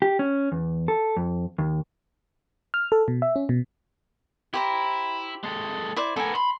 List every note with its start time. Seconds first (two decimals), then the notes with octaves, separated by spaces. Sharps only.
0.02 G4
0.19 C#4
0.52 E2
0.88 A4
1.16 F2
1.58 D#2
2.74 F6
2.92 A4
3.08 B2
3.22 E5
3.36 C#4
3.49 B2
4.54 E4 G4 C5 A#5
5.43 G#3 A4
5.96 E4 C5 D5
6.16 B3 A4 A#4 G#5
6.35 B5 C6